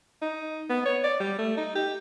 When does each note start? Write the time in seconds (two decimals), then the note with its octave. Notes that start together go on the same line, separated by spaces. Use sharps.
0.22 D#4
0.70 B3
0.85 C#5
1.04 D5
1.20 G3
1.38 A3
1.57 D#4
1.75 G4